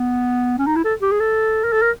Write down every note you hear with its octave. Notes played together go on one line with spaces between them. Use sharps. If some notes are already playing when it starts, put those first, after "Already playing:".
Already playing: B3
C#4
D#4
E4
A4
G4
G#4
A4
A#4
A4
A#4